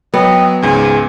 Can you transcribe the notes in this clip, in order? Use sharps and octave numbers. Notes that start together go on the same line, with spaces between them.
F#3 B3 D#5 G5
C#2 G#2 C#3 G#4 G#5